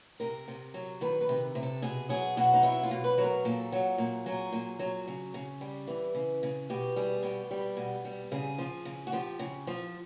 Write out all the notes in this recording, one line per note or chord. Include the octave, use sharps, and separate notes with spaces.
C3 A#4
C3
F#3
D#3 B4
B4
C3
C3
A4
B2 G#4
F#3 G#4
B2 F#4
D#4
F#3 E4
F4
B2
B4
F#3
A#4
A#2 A4
F#3
A#2
F#3 G#4
A#2
F#3
C#3
C#3
G3
E3
C#3
C#3
B2 G4
G3 G#4
B2 G4
G3
B2
G3
C#3 G#4
F3
C#3
F#4
F3 G4
C#3
F3